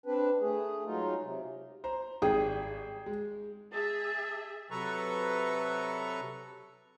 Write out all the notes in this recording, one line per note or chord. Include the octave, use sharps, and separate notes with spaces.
C4 D4 B4
A3 G#4
F#3 G#3 D#4 F4
C3
C5 A#5
G#1 G3 G#4 G5 D#6
G#3
G#4 E5 A5
C3 F#3 A4 B4 A#5 C#6